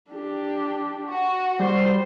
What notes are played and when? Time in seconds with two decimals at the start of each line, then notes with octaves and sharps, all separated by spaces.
0.11 D4 G4
1.07 F#4
1.60 G3 C5